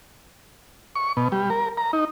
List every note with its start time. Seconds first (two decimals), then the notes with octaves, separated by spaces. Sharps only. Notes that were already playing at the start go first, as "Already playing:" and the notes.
0.95 C#6
1.17 B2
1.32 G3
1.50 A#4
1.77 A#5
1.93 D#4